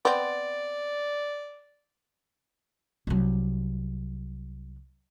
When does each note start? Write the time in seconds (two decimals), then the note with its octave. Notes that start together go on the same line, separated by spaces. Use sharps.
0.05 B3 C4 D5
3.07 C2 F#3